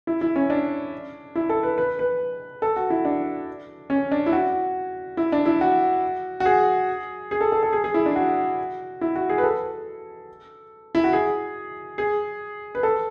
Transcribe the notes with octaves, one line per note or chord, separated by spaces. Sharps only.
E4
E4
C#4
D4
E4
A4
B4
B4
B4
A4
F#4
E4
D4
C#4
D4
E4
F#4
E4
D4
E4
F#4
F#4
G#4
G#4
A4
A4
A4
G#4
G#4
E4
D4
F#4
E4
F#4
G#4
B4
A4
E4
F#4
G#4
G#4
B4
A4